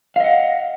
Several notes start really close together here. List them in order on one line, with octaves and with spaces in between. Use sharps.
F5 D#5 F#5